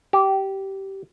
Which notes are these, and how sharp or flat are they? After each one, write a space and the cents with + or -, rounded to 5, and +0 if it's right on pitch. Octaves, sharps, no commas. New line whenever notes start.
G4 -15